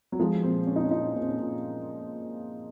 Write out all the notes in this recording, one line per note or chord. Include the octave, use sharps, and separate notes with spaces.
F#3
F3 G#3
A#2 C4
A#2 C#4
D#4
C#4
A#2 D#4
A#2 C4
C#4
A#2